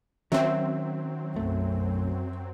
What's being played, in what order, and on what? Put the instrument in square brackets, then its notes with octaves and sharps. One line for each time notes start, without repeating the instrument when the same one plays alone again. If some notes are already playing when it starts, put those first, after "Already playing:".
[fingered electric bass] D#3 C#4 [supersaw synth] F#3 C4 [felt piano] E5
[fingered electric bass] B1 A3 [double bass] F#2